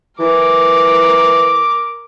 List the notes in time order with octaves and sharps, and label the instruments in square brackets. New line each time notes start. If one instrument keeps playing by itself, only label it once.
[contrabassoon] E3 [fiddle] A#4 D6